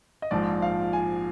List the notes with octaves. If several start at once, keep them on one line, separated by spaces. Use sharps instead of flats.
D#5
A#1 G#2 F3 D5
F5
G#5